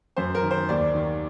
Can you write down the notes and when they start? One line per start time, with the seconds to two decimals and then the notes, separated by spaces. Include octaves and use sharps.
0.17 F#2 C5
0.35 A#4
0.43 D#3
0.51 C5
0.69 D#2 D5
0.95 D#3